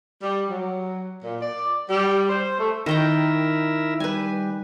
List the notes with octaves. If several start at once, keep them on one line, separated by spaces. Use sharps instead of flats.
G3
F#3
A#2
D5
G3
C5
A3
D#3 E4 A#4 E5 G5 A#5
G3 B4 G#5